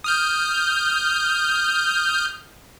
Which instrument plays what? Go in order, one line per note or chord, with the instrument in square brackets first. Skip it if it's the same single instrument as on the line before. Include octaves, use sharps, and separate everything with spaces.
[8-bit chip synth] D#6 F6 G6